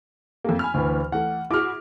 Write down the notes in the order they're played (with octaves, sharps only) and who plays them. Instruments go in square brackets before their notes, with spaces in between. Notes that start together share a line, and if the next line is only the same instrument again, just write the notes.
[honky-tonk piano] F2 A3 A#3
G#5 B5 F6
[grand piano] D2 E3
[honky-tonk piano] E3 A3 [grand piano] F#5
[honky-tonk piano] E4 F#4 G#4 [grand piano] D6 F6